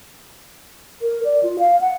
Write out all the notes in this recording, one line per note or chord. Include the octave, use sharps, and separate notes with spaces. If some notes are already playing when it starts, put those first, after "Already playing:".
A#4
D5
F4
F5
F#5